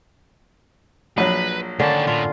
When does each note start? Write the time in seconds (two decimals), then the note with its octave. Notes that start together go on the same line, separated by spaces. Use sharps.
1.18 A#1 F#3 B4
1.80 D3 D#3 A#3 C#4 A5
2.07 A2 F4